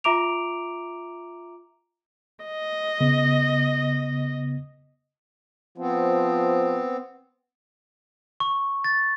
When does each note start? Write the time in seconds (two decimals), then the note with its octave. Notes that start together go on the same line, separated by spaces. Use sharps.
0.04 F4 E5 A#5 D6 D7 F7
2.44 D#5
3.00 C#3 B3
5.78 F3 B3 C4
8.40 C#6
8.84 A6